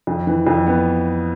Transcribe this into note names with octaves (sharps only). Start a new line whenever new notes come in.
F2
E3
F2
B3